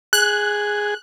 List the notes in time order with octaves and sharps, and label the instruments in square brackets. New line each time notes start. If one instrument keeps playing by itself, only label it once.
[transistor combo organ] G#4 [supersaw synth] F#6